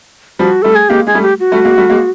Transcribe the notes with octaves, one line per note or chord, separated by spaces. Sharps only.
F3 G3 F#4
G3 A3 A4
G#4
G#3 A#3 G4
G#3 G#4
G3 A3
G4
F#4
G3 A3
G#3 A#3
G3 A3
G#3 A#3